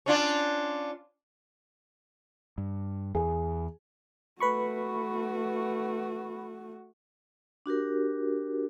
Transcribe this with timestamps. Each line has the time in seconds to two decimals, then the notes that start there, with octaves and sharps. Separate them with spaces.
0.06 C#4 D4 F4
2.58 G2
3.15 E2 G#4
4.40 A3 F#4 B4 B5 C#6
7.66 D4 F#4 G4 A#4